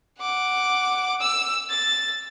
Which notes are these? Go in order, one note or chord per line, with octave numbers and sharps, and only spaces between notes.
F#5 D6
E6 E7
A6